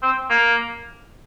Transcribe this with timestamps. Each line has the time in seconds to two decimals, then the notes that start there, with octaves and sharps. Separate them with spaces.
0.02 C4
0.30 A#3